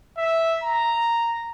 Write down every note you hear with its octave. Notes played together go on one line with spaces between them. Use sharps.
E5
A#5